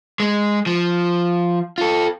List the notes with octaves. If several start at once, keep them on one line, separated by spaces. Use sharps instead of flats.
G#3
F3
F4 A4